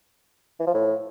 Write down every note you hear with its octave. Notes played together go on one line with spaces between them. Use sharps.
E3
F3
A2